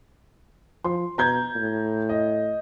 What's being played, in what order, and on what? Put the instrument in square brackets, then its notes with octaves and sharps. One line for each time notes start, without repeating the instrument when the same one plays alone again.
[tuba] F3 [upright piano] C6
[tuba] B2 [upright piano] A#5 G6 G#6
[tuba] A2
[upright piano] D#5